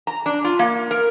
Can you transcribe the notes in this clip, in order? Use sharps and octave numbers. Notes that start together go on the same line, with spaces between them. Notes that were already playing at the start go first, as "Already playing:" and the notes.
A#5
D4
F4
A#3
A#4